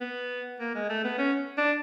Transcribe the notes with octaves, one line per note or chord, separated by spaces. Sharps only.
B3
A#3
G#3
A3
B3
C#4
D4